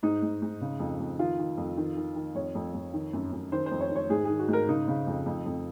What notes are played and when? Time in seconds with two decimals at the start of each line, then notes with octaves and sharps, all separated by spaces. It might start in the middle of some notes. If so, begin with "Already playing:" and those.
0.03 G#2 D#4
0.22 G#2
0.42 G#2
0.61 C#3
0.80 F2
1.00 F2
1.19 D#3 F4
1.39 D#3
1.58 F2
1.77 D#3
1.97 D#3
2.16 D#3
2.35 F2 C#5
2.55 F2
2.74 F2
2.93 D#3
3.13 F#2
3.32 F#2
3.52 D#3 C5
3.66 C5
3.71 F2
3.80 C#5
3.90 D#3
3.96 C#5
4.09 G#2 G#4
4.25 D#3 G#4
4.39 F#4
4.48 G#2
4.53 A#4
4.68 C#3 D#4
4.88 C#3
5.07 F2
5.26 F2
5.46 F2